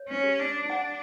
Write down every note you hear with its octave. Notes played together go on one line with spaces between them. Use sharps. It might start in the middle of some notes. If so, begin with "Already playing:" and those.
Already playing: C#5
C#4
G4
D4
D4 F#5